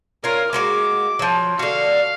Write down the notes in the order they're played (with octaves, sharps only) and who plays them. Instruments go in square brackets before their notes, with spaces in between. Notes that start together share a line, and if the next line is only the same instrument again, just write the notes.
[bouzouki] C#4 F4 [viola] A#4
[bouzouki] G#3 A#3 F#4 [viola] D6
[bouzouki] F3 F#3
[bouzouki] D3 F#4 [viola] F5